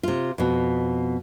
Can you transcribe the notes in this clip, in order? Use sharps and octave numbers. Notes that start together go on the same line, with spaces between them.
C3 F4
F2 B2